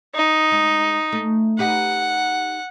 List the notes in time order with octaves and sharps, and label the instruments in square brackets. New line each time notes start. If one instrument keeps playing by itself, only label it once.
[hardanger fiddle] D#4
[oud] G#3
A3
[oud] D#4 G4 B4 [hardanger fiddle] F#5